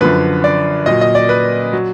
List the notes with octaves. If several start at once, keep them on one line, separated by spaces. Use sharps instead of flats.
F#2 D3 F3 B4
D5
A#2 F#3 D#5
D#5
D5
B4
F#3